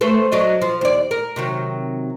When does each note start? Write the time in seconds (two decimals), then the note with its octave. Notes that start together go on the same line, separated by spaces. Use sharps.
0.01 A3 B4 C5
0.32 F#3 D4 D#5
0.62 F3
0.81 D#2 D5
1.11 A#4
1.36 C3 D#3 F#3